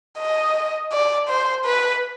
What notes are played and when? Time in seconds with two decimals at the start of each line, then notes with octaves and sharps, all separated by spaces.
0.19 D#5
0.92 D5
1.29 C5
1.65 B4